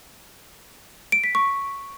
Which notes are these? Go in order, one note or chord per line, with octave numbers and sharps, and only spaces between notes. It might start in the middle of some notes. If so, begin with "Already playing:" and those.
D7
B6
C#6